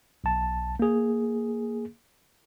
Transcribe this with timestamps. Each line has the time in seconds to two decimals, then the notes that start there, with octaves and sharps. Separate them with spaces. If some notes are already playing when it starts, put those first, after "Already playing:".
0.24 B1 A5
0.80 A#3 G#4